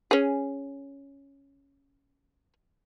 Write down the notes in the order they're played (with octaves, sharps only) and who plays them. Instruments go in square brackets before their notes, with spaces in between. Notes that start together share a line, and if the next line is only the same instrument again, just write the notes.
[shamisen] C#4 G#4